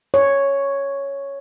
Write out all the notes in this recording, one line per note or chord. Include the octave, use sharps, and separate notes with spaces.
C#5